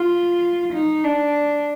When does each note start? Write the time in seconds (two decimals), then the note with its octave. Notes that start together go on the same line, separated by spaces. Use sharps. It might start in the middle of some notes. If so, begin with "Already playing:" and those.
Already playing: F4
0.74 D#4
1.04 D4